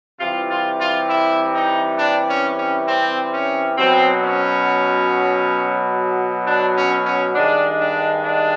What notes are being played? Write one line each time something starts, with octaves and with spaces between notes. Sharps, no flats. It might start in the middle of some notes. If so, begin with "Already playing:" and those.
C3 E3 G3 F4
F4
F4
E4
D#4
D4
C#4
C#4
C4
C#4
B2 F#3 C4
C#4
D4
C#4
C#4
G2 D#3 G#3 D4
D4
D4